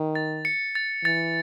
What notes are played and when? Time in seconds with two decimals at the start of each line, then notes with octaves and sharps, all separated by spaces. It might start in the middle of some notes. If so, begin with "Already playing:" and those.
Already playing: D#3
0.15 A6
0.45 C#7
0.75 A6
1.05 E3 A6